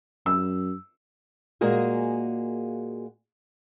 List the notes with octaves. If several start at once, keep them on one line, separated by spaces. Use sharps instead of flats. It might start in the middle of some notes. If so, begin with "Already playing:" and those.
F#2 E6
A#2 G#3 A#3 F#4 G#4